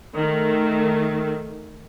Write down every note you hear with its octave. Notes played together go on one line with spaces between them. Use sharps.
D#3 A3